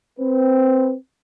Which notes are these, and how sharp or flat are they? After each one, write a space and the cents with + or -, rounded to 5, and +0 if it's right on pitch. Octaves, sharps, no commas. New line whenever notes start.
C4 +0 B4 +0